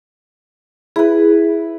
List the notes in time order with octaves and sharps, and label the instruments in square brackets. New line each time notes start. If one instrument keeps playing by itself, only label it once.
[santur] E4 B4 [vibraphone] G#4